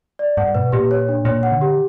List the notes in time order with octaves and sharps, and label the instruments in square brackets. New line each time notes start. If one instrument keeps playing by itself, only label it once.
[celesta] D5
[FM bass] G2 [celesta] F#5
[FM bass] B2 [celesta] B4
[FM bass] A#2 [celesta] G4
[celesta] C#5
D4
[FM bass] A#2 [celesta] C#5
[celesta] F#5
[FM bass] D3
[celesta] G4